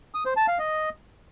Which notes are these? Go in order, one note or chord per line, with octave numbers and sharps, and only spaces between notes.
D#6
C5
A5
F5
D#5